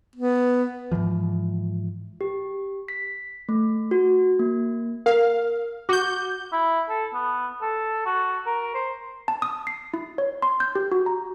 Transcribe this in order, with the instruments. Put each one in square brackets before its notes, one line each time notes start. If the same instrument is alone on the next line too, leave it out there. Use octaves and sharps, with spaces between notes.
[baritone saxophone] B3
[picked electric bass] G#2 C#3 E3 F3
[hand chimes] G4
B6
A3
F#4
A#3
[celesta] A#4 [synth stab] F5
[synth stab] F#4 G6 [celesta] D6
[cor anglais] E4
A4
B3
A4
F#4
A#4
C5
[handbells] A5
D#6
C7
E4
C#5
C6
G6
G4
F#4
A#5